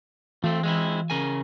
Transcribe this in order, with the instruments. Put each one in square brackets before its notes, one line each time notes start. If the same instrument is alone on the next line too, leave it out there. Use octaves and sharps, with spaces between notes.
[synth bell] E3 [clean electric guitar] A3 C4
[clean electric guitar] G#3 C4 E4
C#3 A#4 G#5